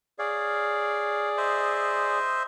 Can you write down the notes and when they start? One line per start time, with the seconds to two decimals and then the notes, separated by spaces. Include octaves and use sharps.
0.19 G#4 C#5 D5 F5
1.37 C5 D#5 E5